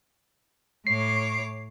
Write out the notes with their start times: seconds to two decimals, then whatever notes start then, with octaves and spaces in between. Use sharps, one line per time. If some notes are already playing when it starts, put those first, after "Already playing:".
0.87 A2 C#5 D6 C7